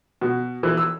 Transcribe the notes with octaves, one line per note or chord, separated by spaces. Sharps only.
B2
E3
E6